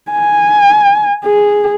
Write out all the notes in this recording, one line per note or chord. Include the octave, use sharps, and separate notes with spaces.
G#5
G#4